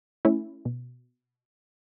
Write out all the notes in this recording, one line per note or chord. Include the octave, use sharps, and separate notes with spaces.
A3 C#4 E4
B2